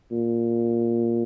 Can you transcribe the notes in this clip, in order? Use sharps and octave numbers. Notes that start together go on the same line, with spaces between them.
A#2